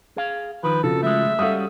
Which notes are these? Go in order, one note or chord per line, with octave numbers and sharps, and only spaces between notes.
G#4 F5
D#3 F3 B4
F2 C#3 F3 F#4 A4
G#3 A3 E5
G3 C#4 F#4 A4 F5 D#6